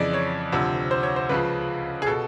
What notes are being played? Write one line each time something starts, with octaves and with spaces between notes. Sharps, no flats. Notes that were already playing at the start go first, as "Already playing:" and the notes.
Already playing: F2 C#3 E3 D5 D#5
C#5
D2 C3 F3
C5
C#5
C5
C#2 C#3 F3 B4
G#4
B2 A4